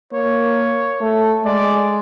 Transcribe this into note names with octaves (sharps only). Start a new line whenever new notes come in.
A#3 C#5
A3
G#3 D5